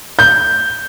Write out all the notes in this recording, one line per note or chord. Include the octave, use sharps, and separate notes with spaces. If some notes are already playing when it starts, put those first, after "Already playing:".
G6